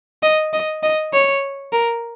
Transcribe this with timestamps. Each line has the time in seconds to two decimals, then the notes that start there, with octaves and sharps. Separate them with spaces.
0.23 D#5
0.53 D#5
0.83 D#5
1.13 C#5
1.72 A#4